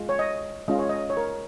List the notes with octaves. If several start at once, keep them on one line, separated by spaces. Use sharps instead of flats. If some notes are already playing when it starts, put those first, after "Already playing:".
Already playing: G#3 F4
C#5
D#5
G#3 C#4 F4 D#5
C#5
D#5
C#5
A#4